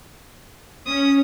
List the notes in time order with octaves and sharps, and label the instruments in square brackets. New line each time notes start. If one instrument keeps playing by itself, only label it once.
[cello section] C#4 [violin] D#6